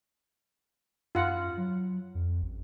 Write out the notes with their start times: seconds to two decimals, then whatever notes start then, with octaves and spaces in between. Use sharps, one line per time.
1.15 F#2 F4 F#5
1.57 F#3
2.15 F2
2.42 A1